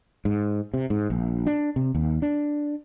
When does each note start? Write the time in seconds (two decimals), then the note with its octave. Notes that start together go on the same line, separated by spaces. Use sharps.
0.25 G#2
0.74 C3
0.90 G#2
1.10 A#1
1.46 D4
1.76 C3
1.95 D#2
2.22 D4